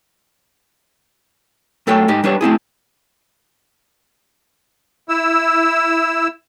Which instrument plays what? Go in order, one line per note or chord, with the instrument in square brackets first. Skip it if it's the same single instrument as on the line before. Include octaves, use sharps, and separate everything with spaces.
[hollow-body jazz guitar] F#2 A3 A4 C#5 G5
G#2 D#4 G4
G3 D4 B4 C#5
A3 C4 E4 G#4
[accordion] E4 E6